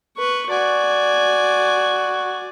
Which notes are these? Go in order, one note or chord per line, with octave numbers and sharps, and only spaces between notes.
B4 C#6
F#4 D5 G#5